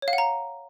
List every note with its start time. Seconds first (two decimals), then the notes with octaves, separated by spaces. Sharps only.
0.02 C#5
0.08 F5
0.13 F#5
0.18 A#5